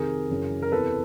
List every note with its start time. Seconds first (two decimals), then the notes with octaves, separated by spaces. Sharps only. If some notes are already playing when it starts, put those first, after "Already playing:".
Already playing: F2 C3 D#3 G#4 A#4
0.30 F#2 C#3 E3
0.62 A#4
0.72 E2 C3 E3 A4 B4